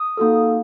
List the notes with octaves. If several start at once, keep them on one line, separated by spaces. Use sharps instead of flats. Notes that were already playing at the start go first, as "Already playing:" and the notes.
Already playing: D#6
A#3 D#4 F#4 A4